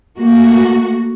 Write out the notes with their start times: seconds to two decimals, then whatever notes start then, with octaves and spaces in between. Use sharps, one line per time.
0.17 A3 A#3 F#4